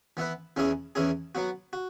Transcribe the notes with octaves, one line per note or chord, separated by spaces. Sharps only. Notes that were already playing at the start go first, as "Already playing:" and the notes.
E3 B3 E4 B4
E2 E3 C#4 E4 G#4
E2 E3 C#4 E4 G#4
F#3 B3 F#4
F#4